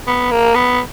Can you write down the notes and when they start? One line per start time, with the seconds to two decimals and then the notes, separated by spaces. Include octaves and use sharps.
0.08 B3
0.31 A#3
0.55 B3